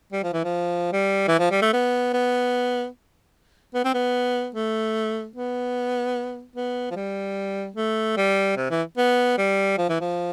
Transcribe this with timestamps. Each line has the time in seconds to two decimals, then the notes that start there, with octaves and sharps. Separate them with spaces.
0.13 G3
0.23 F3
0.33 E3
0.44 F3
0.92 G3
1.28 E3
1.39 F3
1.51 G3
1.62 A3
1.73 B3
2.13 B3
3.75 B3
3.85 C4
3.94 B3
4.55 A3
5.36 B3
6.56 B3
6.91 F3
6.96 G3
7.76 A3
8.17 G3
8.57 C3
8.70 E3
8.97 B3
9.38 G3
9.78 F3
9.89 E3
10.01 F3